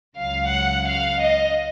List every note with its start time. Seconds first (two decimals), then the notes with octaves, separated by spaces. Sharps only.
0.18 C#2 C#3 F#3 F5
0.52 F#5
0.87 F5
1.21 D#5